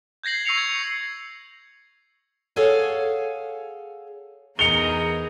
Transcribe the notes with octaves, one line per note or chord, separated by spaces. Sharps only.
G6 G#6 A#6 C7 F#7
C#6 E6 C7 C#7 F7
G#6
G#4 A4 C#5 F5 F#5 G#5
E2 D#4 G#4 A#4 C#7 F7 G7